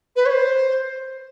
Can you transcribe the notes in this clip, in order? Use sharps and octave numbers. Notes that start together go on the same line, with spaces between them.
B4
C#5
C5